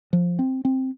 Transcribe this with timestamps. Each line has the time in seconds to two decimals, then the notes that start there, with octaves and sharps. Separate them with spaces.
0.13 F3
0.39 C4
0.65 C4